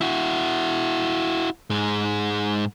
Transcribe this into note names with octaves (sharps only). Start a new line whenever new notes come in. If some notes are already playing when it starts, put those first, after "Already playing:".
E4 F#4
G#2 G#3